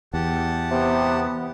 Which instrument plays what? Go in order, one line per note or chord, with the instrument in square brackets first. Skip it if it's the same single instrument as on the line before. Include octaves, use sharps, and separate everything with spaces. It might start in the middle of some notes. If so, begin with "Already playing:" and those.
[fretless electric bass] E2 [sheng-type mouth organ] G4 F#5 A5
[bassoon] C3 [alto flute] B3